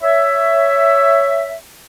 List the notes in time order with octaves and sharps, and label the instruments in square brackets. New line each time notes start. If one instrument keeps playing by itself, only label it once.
[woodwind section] C#5 E5